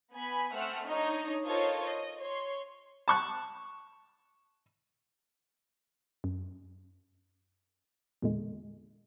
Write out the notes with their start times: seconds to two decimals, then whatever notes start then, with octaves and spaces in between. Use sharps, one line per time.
0.13 B3 G#5 B5
0.54 A3 C4 F#5 E6 F6
0.85 D4 D#4 C#5 D#5
1.44 F4 A4 A#4 C5 C#5 D#5
1.84 D#5
2.19 C#5 C6
3.08 A5 C#6 F#6
6.24 F#2
8.22 E2 A#2 D3 G#3